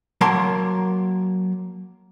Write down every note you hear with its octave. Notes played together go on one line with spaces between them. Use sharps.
F#3 A#3 A#4 A5 C6